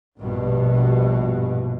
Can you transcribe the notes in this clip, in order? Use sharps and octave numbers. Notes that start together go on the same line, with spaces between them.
A#1 G2 B2